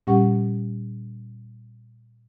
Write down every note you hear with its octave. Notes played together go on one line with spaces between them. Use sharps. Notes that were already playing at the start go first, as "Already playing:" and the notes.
A#2 G3 C#4 G4 F#5 C#6